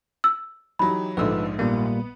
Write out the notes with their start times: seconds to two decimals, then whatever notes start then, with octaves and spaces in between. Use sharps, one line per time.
0.24 E6
0.79 E3 F#3 D#4 G4 B5
1.17 A#1 G#2 D3 F3 A3 B4 E6
1.59 A#2 G3 A#3 B3